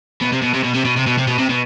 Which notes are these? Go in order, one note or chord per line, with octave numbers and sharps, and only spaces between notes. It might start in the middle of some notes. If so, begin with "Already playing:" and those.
B2
C3
B2
C3
B2
C3
B2
C3
B2
C3
B2
C3
B2